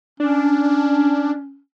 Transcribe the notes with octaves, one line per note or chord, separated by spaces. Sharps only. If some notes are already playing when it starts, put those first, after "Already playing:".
C#4 D4